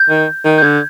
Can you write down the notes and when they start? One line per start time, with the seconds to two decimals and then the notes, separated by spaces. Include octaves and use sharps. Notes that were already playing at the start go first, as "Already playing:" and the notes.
Already playing: G6
0.10 D#3
0.45 D#3
0.58 G6
0.63 D3 G#6